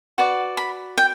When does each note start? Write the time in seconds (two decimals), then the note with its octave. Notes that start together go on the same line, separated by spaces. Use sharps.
0.18 F#4 B4 D5
0.57 B5
0.98 G5